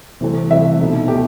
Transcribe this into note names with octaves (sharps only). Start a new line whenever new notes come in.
C3 E3 A3 C4
C3 E3 A3 C4 E5
B2 A3 D#4
B2 A3 D#4 G4